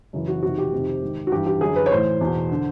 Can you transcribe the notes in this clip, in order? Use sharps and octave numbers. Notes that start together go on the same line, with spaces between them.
F#2 C#3 E3
F#4
F2 C3 D#3 F#4
G4
F2 C3 D#3
G#2 D#3
F#4
G2 E3 G4
G4
F#2 D3 G#4
B4
C#5
A2 E3 C5
E2 B2
D3